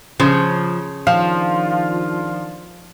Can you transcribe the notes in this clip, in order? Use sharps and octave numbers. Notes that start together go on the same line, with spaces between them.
C#3 F3
D#3 F3 D4 F4 F5